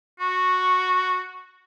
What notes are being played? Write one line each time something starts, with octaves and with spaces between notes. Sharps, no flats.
F#4 C#6